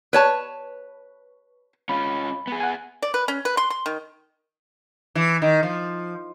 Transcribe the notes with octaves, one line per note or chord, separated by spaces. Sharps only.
B4 C#5 A5
C#4 F4 B5
B3 G#4
F#5 G#5
D5
B4
C#4
B4
C6
C6
D#3
E3
D#3
F3